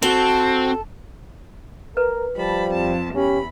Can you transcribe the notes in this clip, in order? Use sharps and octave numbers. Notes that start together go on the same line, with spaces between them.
C4 F#4 A4
A#4 B4
F3 G3 A5 B5
F2 A5
E2 C#4 G4 B5